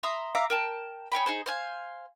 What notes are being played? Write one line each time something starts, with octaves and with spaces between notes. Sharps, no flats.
E5 A#5 C6 D#6
E5 F5 A#5 D6
A#4 G5 A5
G#4 C#5 G5 B5
D#4 G#4 C5
C5 F5 G#5